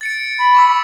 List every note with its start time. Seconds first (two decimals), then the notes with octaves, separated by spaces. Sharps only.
0.01 A6 C#7 D7
0.38 B5
0.55 C#6 D6 E6